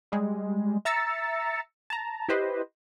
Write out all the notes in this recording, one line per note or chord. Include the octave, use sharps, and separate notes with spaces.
G3 G#3
E5 A#5 E6 A6 C#7
A5 A#5
E4 G4 B4 C5 D#5